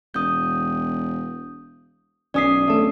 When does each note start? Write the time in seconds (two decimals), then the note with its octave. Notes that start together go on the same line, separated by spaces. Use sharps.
0.14 E1 D#6 G6
2.34 B1 C#4 D5 D#6 B6 C7
2.67 D1 A3 A4